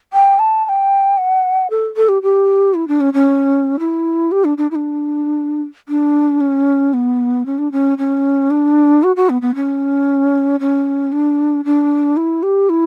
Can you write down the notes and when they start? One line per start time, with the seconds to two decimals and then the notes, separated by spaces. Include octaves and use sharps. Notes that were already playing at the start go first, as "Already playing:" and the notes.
0.13 G5
0.39 A5
0.65 A5
0.69 G5
1.17 F#5
1.70 A4
1.96 A4
2.08 G4
2.22 G4
2.74 E4
2.88 D4
3.00 C#4
3.14 C#4
3.79 E4
4.31 G4
4.44 D4
4.58 D4
4.71 E4
4.75 D4
5.89 D4
6.40 C#4
6.93 B3
7.46 C#4
7.58 D4
7.72 C#4
7.98 C#4
8.50 D4
9.03 F#4
9.16 F#4
9.29 B3
9.42 B3
9.55 C#4
10.60 C#4
11.12 D4
11.65 D4
12.17 E4
12.43 G4
12.69 E4